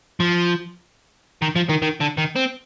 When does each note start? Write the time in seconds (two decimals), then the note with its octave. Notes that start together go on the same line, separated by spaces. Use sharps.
0.20 F3
1.42 D#3
1.56 F3
1.69 D#3
1.82 D#3
2.00 D3
2.17 D#3
2.36 C4